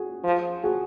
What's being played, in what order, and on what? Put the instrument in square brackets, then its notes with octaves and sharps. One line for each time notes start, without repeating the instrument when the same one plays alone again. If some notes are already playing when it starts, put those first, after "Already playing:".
Already playing: [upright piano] F#4 G#4
[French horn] F3
[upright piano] F#4 G#4